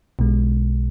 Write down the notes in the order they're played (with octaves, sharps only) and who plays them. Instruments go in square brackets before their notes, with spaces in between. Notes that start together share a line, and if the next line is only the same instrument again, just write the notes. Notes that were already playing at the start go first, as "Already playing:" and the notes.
[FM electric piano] B1 B2 G#3